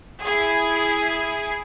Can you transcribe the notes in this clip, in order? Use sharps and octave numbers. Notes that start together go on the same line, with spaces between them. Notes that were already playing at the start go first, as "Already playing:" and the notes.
E4 G#4